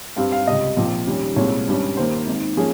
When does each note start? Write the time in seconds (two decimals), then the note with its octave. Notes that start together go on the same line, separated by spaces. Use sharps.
0.16 G2 G3 C4 F5
0.32 F5
0.47 C#2 C3 G3 D#5
0.77 A#1 A#2 F3 C4
1.07 D#2 D#3 G3 C#4
1.36 C2 A#2 G#3 C4 C#5
1.66 G#1 G2 G3 C#4
1.97 D#2 D#3 A#3 C5
2.27 G#1 G#2 D#3
2.57 F3 A#3 C#4 G#4